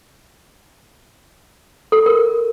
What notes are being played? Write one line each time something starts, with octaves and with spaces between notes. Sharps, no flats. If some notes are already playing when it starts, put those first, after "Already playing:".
A4
A#4